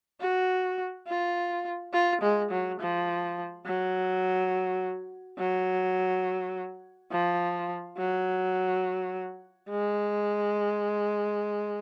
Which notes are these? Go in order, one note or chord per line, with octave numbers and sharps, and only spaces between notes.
F#4
F4
F4
G#3
F#3
F3
F#3
F#3
F3
F#3
G#3